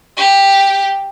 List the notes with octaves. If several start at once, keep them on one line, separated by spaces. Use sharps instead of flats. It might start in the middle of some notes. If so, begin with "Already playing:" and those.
G4